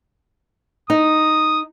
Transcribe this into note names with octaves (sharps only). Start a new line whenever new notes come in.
D#4 D#6